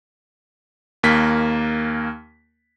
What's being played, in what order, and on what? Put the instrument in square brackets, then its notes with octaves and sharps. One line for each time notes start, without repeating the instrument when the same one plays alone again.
[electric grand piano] D#2 A#3 B6